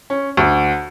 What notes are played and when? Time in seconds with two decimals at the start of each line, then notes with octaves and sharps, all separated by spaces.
0.10 C#4
0.37 D2